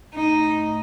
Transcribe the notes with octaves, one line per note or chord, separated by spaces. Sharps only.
A2 D#4